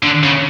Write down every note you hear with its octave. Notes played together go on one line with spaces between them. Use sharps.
D3
C#3